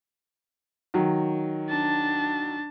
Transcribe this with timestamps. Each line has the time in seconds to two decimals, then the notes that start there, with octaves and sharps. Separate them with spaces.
0.94 D#3 F#3
1.69 D4 A5